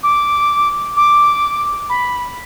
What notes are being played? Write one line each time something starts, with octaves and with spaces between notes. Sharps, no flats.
D6
D6
B5